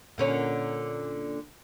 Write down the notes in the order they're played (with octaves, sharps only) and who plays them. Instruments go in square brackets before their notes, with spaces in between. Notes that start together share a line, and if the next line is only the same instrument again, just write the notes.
[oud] A#2 D3 C#4